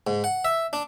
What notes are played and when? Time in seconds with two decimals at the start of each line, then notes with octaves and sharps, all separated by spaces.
0.07 G#2
0.24 F#5
0.45 E5
0.73 D4